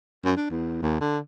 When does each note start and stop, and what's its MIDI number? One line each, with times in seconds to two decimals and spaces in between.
0.25 0.36 42
0.36 0.48 62
0.50 0.79 40
0.82 0.99 39
1.00 1.18 50